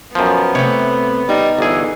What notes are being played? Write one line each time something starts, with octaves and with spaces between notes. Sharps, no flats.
F#2 F3 B3
C3 A3 C#5
G3 D#4
G1 E3 G#4